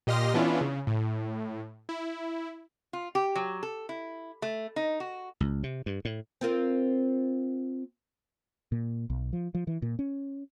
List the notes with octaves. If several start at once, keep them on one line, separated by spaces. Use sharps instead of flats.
A#2 G4 D#5 C6 F6 A#6
E3 B3 C#4 D4 E4 F4
C#3
A2
E4
F4
G4
F#3
A4
E4
A3
D#4
F#4
C#2
C3
G2
A2
C4 F4 A#4
A#2
B1
F3
F3
E3
A#2
C#4